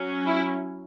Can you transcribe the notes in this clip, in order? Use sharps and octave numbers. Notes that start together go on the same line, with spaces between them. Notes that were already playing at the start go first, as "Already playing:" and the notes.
Already playing: F#3 C#4
E4